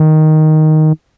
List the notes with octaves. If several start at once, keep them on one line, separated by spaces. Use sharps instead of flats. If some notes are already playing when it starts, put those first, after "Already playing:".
Already playing: D#3